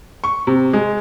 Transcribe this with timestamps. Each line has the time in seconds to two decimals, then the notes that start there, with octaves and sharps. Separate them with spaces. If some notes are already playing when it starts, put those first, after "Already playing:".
0.24 C#6
0.47 C3
0.73 G#3